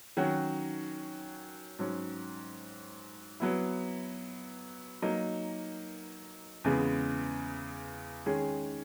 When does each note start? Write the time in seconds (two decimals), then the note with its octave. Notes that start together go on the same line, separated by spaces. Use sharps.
0.17 D#3 F#3 C#4 F#4
1.79 G#2 F#3 C#4
3.40 F#3 B3 E4
5.02 F#3 A#3 D#4
6.64 E2 C#3 G#3 B3
8.26 D#3 G#3 C#4 G#4